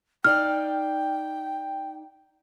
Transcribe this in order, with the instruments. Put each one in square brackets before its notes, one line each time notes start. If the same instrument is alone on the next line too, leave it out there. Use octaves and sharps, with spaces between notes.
[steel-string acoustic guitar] D#4 D5 F5 [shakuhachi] G5 [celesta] F6